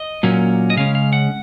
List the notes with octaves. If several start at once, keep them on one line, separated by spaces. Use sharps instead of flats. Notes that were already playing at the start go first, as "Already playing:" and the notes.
Already playing: D#5
A#2 F#3 A#3 C#4
D#5
C#3 G#3 C#4 F5
F5
F#5